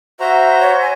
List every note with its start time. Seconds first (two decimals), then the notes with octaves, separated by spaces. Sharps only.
0.20 F#4 C5 E5 A#5
0.59 C#5
0.81 G#5